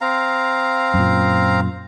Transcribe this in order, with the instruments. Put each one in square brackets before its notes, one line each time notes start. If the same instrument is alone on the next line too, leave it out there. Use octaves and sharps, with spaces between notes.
[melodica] C4 F5 A#5
[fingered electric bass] F#2 A#2